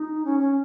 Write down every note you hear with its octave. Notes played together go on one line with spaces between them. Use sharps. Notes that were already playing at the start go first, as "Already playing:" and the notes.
Already playing: D#4
C#4
C#4